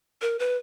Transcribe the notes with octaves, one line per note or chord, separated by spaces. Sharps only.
A#4
B4